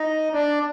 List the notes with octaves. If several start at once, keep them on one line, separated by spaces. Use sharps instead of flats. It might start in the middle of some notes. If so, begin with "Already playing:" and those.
Already playing: D#4 D#5
D4 D5